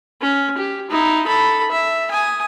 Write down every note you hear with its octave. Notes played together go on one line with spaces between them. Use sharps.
C#4
G4
D#4 E4
A4 B5
E5
G#5 D#6